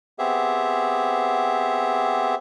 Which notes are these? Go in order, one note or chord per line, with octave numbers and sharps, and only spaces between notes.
B3 C4 G4 G#4 E5